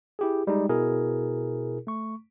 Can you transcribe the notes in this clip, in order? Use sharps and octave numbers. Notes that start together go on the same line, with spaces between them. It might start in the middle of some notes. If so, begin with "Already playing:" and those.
E4 G4 G#4
G3 G#3 D#4
B2 E4 G#4 A#4
A3 C#6